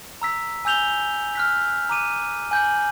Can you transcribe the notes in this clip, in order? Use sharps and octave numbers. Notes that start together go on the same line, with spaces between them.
A#5 E6 B6
G#5 E6 G6 F7 G7
F6 F#6 B6
A#5 D6 D#7
G#5 G6 F#7